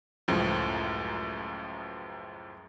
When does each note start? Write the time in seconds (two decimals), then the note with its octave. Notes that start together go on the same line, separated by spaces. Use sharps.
0.28 C#2 F#2 A2 F3